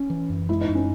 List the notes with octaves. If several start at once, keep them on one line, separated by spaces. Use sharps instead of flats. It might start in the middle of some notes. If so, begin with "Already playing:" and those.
Already playing: C#4
E3
F#2
G#3 E4
D#4
F#2
C#4